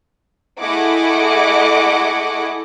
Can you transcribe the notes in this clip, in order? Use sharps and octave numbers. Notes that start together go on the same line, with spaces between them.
A3 E4 G#4 D#5 F#5 D6